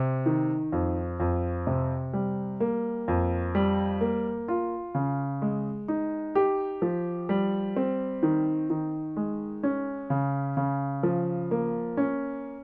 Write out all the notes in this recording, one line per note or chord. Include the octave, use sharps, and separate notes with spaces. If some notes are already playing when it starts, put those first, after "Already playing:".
Already playing: C3
D#3
F2
F2
C3
G3
A#3
F2
G3
A#3
F4
C#3
G#3
D#4
G4
F3
G3
C4
D#3
D#3
G#3
C#4
C#3
C#3
F3
A#3
C#4